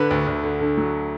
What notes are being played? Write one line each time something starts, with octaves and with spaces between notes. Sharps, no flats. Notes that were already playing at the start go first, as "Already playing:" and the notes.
Already playing: D3 B4
D2
D2
D3
D3
F#3